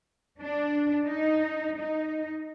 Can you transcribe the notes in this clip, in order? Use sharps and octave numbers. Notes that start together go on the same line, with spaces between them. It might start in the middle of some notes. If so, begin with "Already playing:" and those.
D4
D#4
D#4